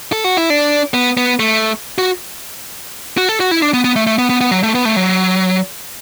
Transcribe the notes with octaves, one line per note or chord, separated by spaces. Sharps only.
A4
F#4
E4
D4
B3
B3
A3
F#4
F#4
A4
F#4
E4
D4
B3
B3
A3
A3
B3
B3
B3
F#3
A3
B3
A3
F#3